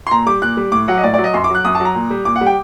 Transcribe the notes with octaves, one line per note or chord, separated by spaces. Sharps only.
C6
A#2 A#5
G3 D6
A#2 F#6
G3
A2 D6
F#3 F#5
D#5
A2 D5
D5
F#3
D#5
F#2 C6
D6
F#3 F#6
F#2 D#6
A5
F#3
A#5
A#2
G3
A#2 D6
F#5
G3
G5